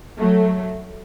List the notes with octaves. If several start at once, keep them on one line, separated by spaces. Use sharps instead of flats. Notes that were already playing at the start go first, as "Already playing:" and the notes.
F#3 A3